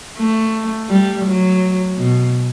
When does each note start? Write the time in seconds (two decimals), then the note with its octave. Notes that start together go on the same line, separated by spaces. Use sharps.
0.18 A3
0.89 G3
1.25 F#3
1.98 B2